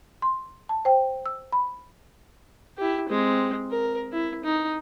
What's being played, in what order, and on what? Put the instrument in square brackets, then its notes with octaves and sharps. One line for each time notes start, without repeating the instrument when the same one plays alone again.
[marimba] C6
A5
C5 G5
E6
B5
[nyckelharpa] E4 G4
G#3 C4
A#4
E4
D#4